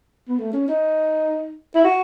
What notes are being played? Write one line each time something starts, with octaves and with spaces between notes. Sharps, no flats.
B3
A3
C#4
D#4
E4
F#4